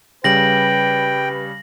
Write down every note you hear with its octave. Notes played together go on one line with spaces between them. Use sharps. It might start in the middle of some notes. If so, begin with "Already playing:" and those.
C#3 G3 B4 G5 A#6 F#7